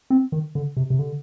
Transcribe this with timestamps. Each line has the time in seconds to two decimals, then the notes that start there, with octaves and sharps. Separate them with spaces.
0.10 C4
0.32 D#3
0.55 D3
0.77 C3
0.90 C3
0.99 D3